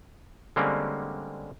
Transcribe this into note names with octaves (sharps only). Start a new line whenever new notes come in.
D3 G3 G#3 A#3 C4 C#4